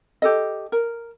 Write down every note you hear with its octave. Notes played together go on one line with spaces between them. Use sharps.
G4 A4 D#5
A#4